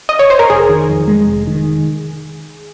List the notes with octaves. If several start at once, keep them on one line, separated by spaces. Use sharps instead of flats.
D#5
C#5
C5
A#4
F1 G#4
D#3
F2
G#3
F1
D#3